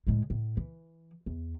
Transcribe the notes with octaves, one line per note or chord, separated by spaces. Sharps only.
A2 G#3
A2
E3
E2